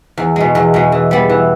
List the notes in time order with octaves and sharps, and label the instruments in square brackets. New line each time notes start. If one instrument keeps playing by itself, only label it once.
[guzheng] E2
B2 G#3
E2
B2 G#3
E3
G3 B3
E3